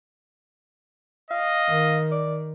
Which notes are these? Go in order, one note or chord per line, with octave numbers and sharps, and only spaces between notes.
D#5 F5
D#3
D5